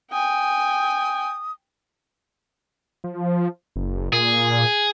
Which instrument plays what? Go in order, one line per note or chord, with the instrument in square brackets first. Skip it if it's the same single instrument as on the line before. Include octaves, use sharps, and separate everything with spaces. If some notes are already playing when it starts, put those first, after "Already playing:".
[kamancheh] G5 G#5 [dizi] D#6
[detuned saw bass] F3
F#1
[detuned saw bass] A#2 [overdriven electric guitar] G#4